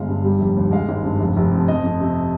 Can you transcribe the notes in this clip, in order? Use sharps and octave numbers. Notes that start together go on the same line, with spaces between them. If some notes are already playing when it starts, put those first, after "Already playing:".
Already playing: G1 G#3 F5
G2
G3
F1
D#2
G#3 F5
G#1
G2
F1
F1
F2
F2 D#5
F2
C3